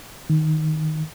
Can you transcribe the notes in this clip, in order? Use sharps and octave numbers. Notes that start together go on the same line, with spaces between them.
D#3